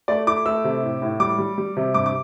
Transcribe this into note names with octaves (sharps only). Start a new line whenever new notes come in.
A3 D5
E4 D6
A3 E6
C3
A2
A2
G3 D6
G3
G3
C3
G2 D6
D6